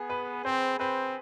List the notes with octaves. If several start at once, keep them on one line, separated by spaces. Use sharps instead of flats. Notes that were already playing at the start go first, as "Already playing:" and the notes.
Already playing: B3 G#4
B4
C4 C5
C4 B4